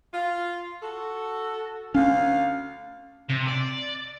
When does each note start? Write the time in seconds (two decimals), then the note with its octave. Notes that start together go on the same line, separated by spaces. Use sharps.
0.13 F4
0.82 F#4 A4
1.95 D2 C#4 F5
3.30 C3
3.48 D5